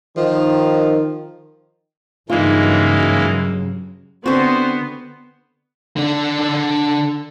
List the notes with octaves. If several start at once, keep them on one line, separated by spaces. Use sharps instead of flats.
D#3 F3
G2 C#3 E3 F#3 G#3 A#3 D#4 F4
D3 B3 C4 F#4 C5
D3 D4